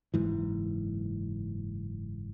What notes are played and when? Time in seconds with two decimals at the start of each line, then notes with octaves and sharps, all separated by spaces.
0.14 F#1 G#2 E3